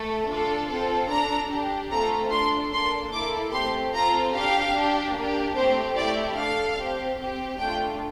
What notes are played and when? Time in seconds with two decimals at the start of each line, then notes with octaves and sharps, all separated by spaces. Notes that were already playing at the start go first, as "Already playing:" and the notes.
Already playing: A3 A4
0.28 D4 F4 A4
0.69 C4 F4 A4
1.09 D4 A4 A#5
1.50 D4 G4
1.90 A3 C4 F4 A4 A#5
2.31 D4 A4 C6
2.72 A#3 D4 A4 C6
3.12 A#3 E4 A4 D6
3.53 A3 C4 G4 C6
3.93 C4 F4 A4 A#5
4.34 D4 G4 F5
4.74 D4 G4
5.15 A#3 D4 G4
5.56 A3 C4 G4 C5
5.96 A3 E4 G4 D5
6.37 D4 A4 F5
6.77 C4 G4
7.18 C4 G4
7.58 A3 D4 F4 G5